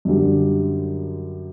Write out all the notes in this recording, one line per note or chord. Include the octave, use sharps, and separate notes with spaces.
F#2 D3 G3